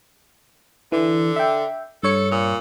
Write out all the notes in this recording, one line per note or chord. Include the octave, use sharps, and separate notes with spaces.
D3 E3
E5 G5
G2 A4 C#5 C#7
A#2